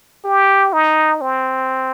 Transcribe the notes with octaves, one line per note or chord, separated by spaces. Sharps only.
G4
D#4
C4